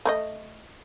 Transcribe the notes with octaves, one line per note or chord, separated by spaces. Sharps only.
A3 A#4 D#5